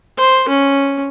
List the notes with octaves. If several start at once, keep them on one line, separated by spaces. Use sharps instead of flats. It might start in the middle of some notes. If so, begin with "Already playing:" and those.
C5
C#4